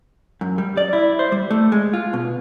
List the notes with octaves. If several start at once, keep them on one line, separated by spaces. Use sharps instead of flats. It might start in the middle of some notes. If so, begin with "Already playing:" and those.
F#2
G3
D5
E4
C5
G3
A3
G#3
F4
B2